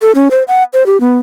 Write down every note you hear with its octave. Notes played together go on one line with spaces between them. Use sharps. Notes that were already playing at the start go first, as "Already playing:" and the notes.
A4
C#4
C5
F#5
C5
G4
B3